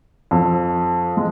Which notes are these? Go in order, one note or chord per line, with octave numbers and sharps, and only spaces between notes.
F2
G#3